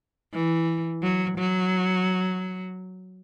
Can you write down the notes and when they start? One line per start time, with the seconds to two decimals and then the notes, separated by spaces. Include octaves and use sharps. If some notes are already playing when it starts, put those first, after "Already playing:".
0.33 E3
1.03 F#3
1.38 F#3